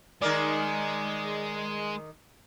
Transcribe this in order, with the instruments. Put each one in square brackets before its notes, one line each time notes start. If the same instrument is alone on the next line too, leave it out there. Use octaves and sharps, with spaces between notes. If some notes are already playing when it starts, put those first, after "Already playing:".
[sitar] D#3 A#4 D5 [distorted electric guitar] G#3